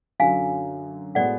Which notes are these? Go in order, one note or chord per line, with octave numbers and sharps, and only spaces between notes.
F#2 D3 F#3 F5 G#5
A2 G#3 B3 F#4 B4 D5 F#5